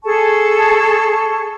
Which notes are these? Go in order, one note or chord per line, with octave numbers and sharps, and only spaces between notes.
G#4 A4 A5 C#6